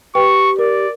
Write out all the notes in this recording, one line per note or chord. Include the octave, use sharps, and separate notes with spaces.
G4 B4 G5 C#6
A#4 D5